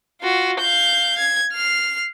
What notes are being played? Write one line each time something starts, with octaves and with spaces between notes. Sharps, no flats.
F4 F#4
F5 G6
G#6
F6 C7